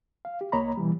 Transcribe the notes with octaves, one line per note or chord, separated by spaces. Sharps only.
F5
G4
C2 A#3 C#5 D#5 A#5 B5
B2 E3 G3